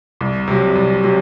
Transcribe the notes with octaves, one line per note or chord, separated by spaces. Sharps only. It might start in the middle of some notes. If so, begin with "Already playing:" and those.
C2
C3 F#3
C2
C3 F#3